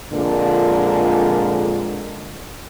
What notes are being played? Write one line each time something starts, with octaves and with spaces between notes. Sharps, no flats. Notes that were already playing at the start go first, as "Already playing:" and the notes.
F2 A#2 D3 G#3 A#4